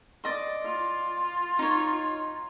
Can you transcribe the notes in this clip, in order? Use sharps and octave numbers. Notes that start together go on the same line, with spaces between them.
D5 D#5 C6
F4
D#4 C#5